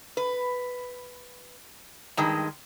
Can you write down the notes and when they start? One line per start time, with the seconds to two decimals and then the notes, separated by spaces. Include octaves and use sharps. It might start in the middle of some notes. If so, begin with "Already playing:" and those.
0.17 B4
2.17 G2 D#3 G#3